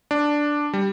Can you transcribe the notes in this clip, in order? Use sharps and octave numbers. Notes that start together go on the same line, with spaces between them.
D4
G3